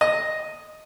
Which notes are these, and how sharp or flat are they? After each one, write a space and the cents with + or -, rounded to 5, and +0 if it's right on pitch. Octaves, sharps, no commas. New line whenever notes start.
D#5 +0